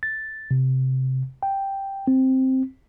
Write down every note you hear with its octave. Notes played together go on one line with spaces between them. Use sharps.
A6
C3
G5
C4